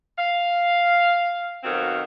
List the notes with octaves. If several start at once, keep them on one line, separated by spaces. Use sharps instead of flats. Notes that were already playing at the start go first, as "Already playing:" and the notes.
F5
F2 B2 D#3 F#3 C4 F5